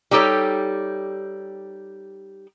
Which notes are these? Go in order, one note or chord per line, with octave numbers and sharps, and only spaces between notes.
G3 D#4 G4 A4 C#5